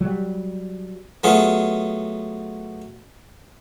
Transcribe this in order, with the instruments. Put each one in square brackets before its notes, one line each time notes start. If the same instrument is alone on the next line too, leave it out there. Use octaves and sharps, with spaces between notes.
[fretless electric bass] F#3 G3
[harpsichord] F#3 A3 B3 F4 G#4